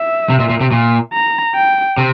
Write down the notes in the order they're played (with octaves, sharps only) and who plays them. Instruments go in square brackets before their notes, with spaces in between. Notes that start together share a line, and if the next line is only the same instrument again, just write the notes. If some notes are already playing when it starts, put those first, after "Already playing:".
Already playing: [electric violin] E5
[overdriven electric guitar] C3
A#2
A#2
C3
A#2
[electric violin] A#5
G5
[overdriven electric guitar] C3